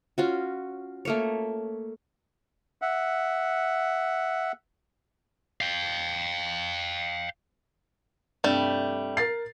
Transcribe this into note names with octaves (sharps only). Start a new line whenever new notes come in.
C#4 F4 F#4
A3 A#3 C#5
E5 F#5
F5 G5
G2 C3 G3 A3
A#4 A6 C7